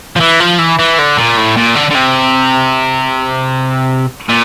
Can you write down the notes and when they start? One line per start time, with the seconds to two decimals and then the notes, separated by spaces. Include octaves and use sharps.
0.16 F3
0.20 E3
0.40 F3
0.59 E3
0.79 E3
0.99 D3
1.17 A#2
1.37 A2
1.57 A#2
1.76 D3
1.91 D3
1.95 C3
4.29 A#2